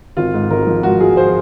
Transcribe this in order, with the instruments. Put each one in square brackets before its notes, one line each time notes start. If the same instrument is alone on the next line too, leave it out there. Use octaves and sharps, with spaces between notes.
[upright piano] G#1 F4
G#2
G#1 A#4
F3
G#2 F#4
F3 G#4
C5